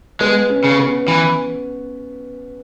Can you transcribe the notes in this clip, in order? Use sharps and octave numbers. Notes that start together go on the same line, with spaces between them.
G#3 B3
C#4
C#3
B3
E3